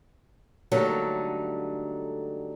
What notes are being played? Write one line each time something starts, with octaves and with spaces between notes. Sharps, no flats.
D3 F#3 G3 A3 A#3 D#4